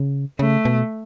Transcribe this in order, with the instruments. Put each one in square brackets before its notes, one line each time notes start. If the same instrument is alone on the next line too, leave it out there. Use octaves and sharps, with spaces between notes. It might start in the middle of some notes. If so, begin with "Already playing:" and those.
Already playing: [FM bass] C#3
[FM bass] C#3 [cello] A3
[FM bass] B2